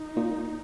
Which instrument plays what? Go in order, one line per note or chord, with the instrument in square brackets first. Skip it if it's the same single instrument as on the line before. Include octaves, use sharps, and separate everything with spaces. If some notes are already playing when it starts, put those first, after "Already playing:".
Already playing: [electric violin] D#4
[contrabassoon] A#2